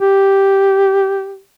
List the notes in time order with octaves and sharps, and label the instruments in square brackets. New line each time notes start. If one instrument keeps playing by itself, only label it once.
[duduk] G4